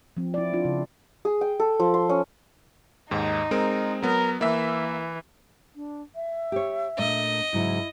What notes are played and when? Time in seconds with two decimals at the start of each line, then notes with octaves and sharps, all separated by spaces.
0.17 F3 C4
0.34 E4 D5
0.53 D4 F4
0.65 C#3
1.25 G#4
1.41 G5
1.60 A4
1.80 F3
1.94 C6
2.09 C#4
3.11 D#2 G#2 D#4
3.51 G#3 C4 A#4
4.02 F#3 B3 A#4
4.41 E3 A#3 E5
5.76 D4
6.15 E5
6.52 G4 C#5
6.99 A#2 A3 D4 D#5
7.53 G#2 C#3 F#3 E4